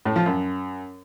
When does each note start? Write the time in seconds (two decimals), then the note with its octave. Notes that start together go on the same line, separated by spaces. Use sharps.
0.05 A2
0.16 F3
0.26 F#2